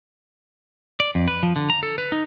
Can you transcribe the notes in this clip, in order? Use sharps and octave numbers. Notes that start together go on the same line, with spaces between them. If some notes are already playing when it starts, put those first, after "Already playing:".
D5
F2
B4
F3
D3
A#5
A4
B4
D#4